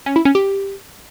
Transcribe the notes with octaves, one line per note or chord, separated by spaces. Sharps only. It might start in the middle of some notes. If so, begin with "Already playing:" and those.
C#4
E4
C#4
G4